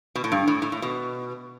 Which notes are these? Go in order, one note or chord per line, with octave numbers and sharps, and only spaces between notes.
B2
A2
G2
A2
A2
A2
B2